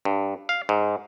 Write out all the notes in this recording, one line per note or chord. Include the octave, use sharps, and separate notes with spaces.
G2
F5
G#2